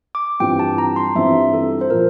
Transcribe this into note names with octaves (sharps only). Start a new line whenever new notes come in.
D6
G2 E3 G3 C4 F4 G5
A5
A#5
C6
G2 E3 G3 C4 F4 E5
A4
C5
A#2 F3 A#4